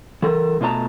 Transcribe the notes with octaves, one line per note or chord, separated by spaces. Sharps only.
E3 A4 A#4
B2 A3 F4 C5 A5 A#5